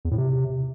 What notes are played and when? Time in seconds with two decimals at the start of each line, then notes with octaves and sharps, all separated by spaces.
0.05 E2
0.11 A2
0.18 C3